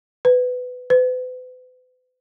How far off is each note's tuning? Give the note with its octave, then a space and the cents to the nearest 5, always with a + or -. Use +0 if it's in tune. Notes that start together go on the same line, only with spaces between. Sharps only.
B4 +20
B4 +40